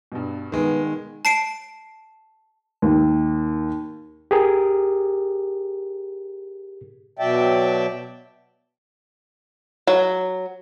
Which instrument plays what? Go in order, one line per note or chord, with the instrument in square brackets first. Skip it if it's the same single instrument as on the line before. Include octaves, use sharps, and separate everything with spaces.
[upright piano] G2 B2
[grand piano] D#3 G#3 [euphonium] B3
[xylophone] A5 C7 D7
[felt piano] D#2
[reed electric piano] G4 G#4 A#4
[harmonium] B2 F#3 D5 E5 G5 A5
[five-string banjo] F#3